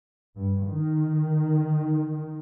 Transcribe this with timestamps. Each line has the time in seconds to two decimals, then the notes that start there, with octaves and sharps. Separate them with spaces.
0.37 G2
0.67 D#3